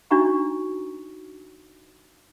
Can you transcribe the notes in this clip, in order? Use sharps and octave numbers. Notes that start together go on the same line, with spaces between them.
D4 D#4 F#4 G#5 A#5 C#6